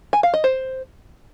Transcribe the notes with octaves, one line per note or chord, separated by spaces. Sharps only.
G#5
F5
D#5
C5